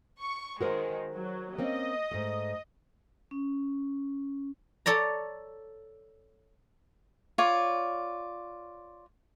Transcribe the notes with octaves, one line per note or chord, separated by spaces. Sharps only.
C#6
D#3 G#3 F#4 A#4 C5
F#3
A#3 C4 C#4 D#5
G#2 A3
C#4
A4 C#5 D5 A#5
F4 C#5 D5